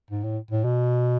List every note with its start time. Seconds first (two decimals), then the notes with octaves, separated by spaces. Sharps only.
0.11 G#2
0.24 A2
0.51 A2
0.64 B2